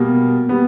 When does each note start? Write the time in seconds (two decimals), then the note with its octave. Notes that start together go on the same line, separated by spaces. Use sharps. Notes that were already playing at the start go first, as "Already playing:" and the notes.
Already playing: B2 G3 A#3
0.49 G3 B3